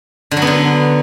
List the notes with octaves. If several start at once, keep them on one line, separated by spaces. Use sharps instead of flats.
D3
F#3
B3
D3